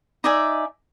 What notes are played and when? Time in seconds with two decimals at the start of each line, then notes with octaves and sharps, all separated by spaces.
0.24 D#4 D5 E5 G#5